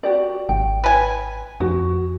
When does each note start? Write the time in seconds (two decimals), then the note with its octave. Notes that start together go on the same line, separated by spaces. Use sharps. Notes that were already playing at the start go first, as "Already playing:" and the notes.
0.03 F#4 G4 D5
0.49 G#1 G5
0.84 B4 G#5
1.60 F2 F#4